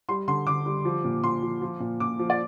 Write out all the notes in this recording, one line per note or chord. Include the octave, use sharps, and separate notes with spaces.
G3 C6
D3 C6
D3 D6
G3
F3
A#2
A#2 C6
F3
F3
A#2
A#2 D6
F3
D5